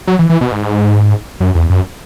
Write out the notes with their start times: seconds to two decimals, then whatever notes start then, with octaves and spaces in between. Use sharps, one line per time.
0.07 F#3
0.19 E3
0.30 E3
0.41 B2
0.52 G#2
1.40 F#2
1.55 E2
1.70 F#2